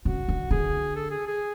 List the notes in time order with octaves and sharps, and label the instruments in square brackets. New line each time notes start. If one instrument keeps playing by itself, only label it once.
[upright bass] C#3 [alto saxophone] F#4
[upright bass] D3
[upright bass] D3 [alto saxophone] G#4
[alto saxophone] A4
G#4
G#4